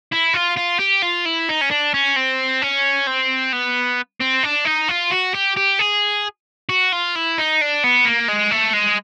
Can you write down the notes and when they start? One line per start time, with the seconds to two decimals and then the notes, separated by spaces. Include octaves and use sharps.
0.13 E4
0.34 F4
0.57 F4
0.80 G4
1.03 F4
1.26 E4
1.49 D#4
1.61 C#4
1.71 D4
1.94 C#4
2.16 C4
2.62 C#4
3.07 C4
3.53 B3
4.21 C4
4.44 D4
4.65 D#4
4.88 F4
5.11 F#4
5.34 G4
5.56 G4
5.79 G#4
6.69 F#4
6.92 F4
7.16 E4
7.38 D#4
7.61 D4
7.84 B3
8.05 A#3
8.28 G#3
8.51 A3
8.74 G#3